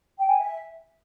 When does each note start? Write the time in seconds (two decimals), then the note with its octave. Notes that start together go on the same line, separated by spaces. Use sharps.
0.18 G5
0.29 G#5
0.39 E5